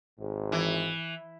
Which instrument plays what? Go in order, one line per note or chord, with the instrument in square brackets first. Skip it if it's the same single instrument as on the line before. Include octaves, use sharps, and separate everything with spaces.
[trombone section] G#1 G#2
[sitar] E3